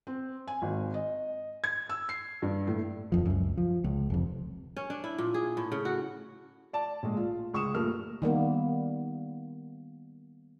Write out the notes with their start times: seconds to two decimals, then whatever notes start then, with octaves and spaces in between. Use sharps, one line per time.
0.07 C4
0.47 G#5
0.62 G#1
0.94 D#5
1.64 G#6
1.89 E6
2.09 C7
2.42 G2
2.67 A2
3.12 D1 F2 F3
3.26 C#2 F#2
3.57 F3
3.84 C#2
4.10 F1 F2
4.77 C#4
4.90 D4
5.04 E4
5.18 A#2
5.34 G#4
5.57 A2
5.72 C#3
5.85 F#4
6.73 D5 A5
7.03 A#1 G#3
7.17 F4
7.54 C#2 C#6 D#6 E7
7.74 G2 A#2 A3 A#4 F6
8.22 D#3 G3 A#3 B3